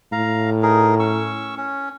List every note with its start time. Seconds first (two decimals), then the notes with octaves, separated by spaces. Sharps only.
0.12 A2 F5 A#5
0.63 D#4 G#4 A#4
0.99 C#4 C#6 E6
1.57 C#4